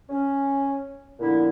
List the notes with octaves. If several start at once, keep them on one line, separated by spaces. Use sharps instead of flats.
C#4
A#2 D3 F3 B3 E4